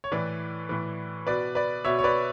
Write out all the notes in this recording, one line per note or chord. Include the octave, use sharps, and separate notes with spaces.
C#5
A2 E3 B4 D5
A2 E3
B2 B4 D5
B4 D5
B2 C#5 E5
C#5
B4 D5